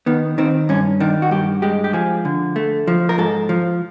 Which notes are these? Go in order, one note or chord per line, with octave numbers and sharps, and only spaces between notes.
D#3 B3
D#3 C4
G2 C#4
D#3 D4
F#4
G2 G4
G#3 G4
G4
F3 G#4
D3
A3
F3
A#4
G#2 A4
F3